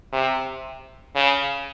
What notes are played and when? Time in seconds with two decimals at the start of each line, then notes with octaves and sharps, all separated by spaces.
0.13 C3
1.15 C#3